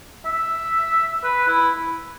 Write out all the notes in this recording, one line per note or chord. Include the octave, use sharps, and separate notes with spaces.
E5
B4
E4